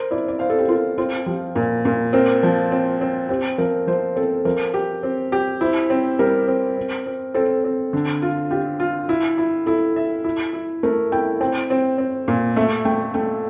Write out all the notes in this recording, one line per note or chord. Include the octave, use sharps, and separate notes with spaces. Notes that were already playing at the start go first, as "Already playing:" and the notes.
Already playing: A#4 C5
E4 D5
D5
C5 F5
A4
G4
F4 A#4
C4 F4
F3 G4
A#2 A#4
A#2 A#4
C4 A#4
F3
C4
C4
C4 G4
F3 A#4
F3 C5
C4 A4
F3 A#4
G4
C4
G4
E4 C5
C4
G3 A#4
C4
C4
C4
C4 A4
C4
D3
F4
F4 G4
F4
E4
E4
E4 A4
E5
E4
E4
A3 A#4
E4 G5
C4 G5
C4
C4
A#2
A3 E5
A3 G5
A3 G5